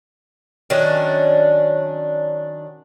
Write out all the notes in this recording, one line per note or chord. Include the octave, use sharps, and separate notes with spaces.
D#3 F#3 C#4 D4